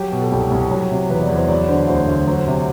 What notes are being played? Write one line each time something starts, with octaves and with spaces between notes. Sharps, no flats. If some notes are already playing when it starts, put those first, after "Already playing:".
Already playing: F#3 G4
B2
A4
C2 G4
C2
F#3
C3
E2 B4
D5
E2
C5
F#3 D5
D3 C5
D2 C5
D2
F#3 C5
C3